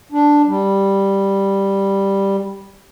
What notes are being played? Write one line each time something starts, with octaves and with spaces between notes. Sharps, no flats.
D4
G3